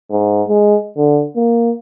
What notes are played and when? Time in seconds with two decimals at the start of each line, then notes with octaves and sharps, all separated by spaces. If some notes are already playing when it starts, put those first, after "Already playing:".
0.11 G#2
0.48 G#3
0.97 D3
1.36 A#3